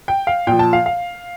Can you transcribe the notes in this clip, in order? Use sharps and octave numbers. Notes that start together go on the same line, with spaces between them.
G5
F5
A#2 F3 G5
A5
F5
F5